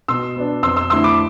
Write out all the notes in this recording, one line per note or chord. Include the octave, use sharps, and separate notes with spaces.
B2 C6 E6
B3 D4
F2 C6 E6
C6 E6
D3 A3 C4 E4 C6 E6
B5 D6